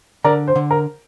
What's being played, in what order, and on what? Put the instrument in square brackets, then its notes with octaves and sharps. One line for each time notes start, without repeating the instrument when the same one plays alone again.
[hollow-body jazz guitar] D3 [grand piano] A#4 D5
[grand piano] C5
[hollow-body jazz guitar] D3
[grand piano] A#4